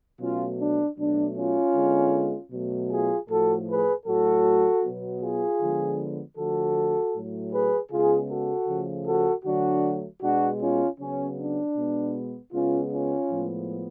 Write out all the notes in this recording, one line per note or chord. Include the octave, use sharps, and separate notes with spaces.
B2 F#3 A3 C#4 F4
D4
B2 F#3 A3 D4
C#4 F4
D3 G#3 B3
B2 F#3 A3
F4 G#4
A2 F3 A3 F#4 A4
G#4 B4
A2 F#3 A3 F#4 A4
B2 F#3 B3
F4 G#4
D3 F3 G#3 B3
D3 F3 A3 F#4 A4
A2 F#3 A3
G#4 B4
C#3 G#3 B3 F4 G#4
F#4 A4
C#3 F3 A3
F#4 A4
D3 F#3 A3 D4 F#4
B2 G#3 B3 D4 F#4
C#4 F4
C#3 F#3 B3 C#4
D4
B2 G#3 B3
C#3 G#3 B3 C#4 F4
C#4 F4
A2 F3 G#3 B3